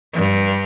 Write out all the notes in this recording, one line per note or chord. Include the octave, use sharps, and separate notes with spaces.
G2